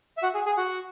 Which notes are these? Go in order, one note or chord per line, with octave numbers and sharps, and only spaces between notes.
E5
F#4 F#5
G#4 G#5
G#4 G#5
F#4 F#5